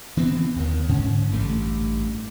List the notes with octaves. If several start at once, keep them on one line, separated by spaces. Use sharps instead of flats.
E3 B3 C4
D#2 D#3
G#2 D3 C#4
A1 G2 A3